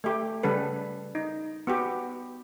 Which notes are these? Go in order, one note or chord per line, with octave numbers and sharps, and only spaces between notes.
A3 G4
C#3 G3 C#4 A4 B4
D#4
B3 F#4 G4